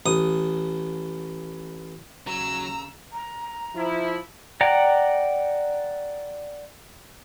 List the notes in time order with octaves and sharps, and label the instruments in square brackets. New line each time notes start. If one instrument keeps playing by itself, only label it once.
[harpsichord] A1 D#6
[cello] D#2 C#3 [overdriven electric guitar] F#3 [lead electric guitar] A#5 [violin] E6
[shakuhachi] A#5
[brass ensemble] F3 E4
[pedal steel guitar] D5 F#5 G5 A#5